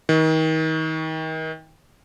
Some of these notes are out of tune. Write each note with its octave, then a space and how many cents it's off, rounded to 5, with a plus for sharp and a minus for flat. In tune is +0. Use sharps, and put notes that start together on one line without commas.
D#3 +35